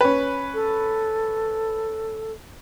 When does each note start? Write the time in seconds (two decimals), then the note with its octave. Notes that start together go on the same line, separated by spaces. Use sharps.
0.01 C#4 B4
0.54 A4